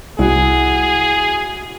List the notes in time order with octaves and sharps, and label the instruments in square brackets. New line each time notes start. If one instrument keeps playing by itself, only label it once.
[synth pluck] C2 [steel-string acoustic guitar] E4 F#4 [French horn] G#4